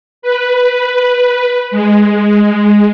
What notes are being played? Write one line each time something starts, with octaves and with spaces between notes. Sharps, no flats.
B4
G#3